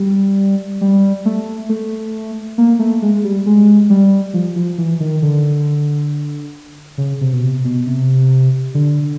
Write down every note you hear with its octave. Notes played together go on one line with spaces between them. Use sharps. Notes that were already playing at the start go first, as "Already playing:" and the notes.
Already playing: G3
G3
A3
A3
A#3
A3
G#3
G3
G#3
G3
F3
F3
E3
D#3
D3
C#3
C3
B2
C3
B2
C3
D3